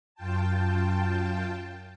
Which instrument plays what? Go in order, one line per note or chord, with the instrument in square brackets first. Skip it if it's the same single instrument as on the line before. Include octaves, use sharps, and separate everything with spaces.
[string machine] F#2 F4 G5 A5